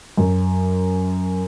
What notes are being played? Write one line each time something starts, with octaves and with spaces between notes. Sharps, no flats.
F#2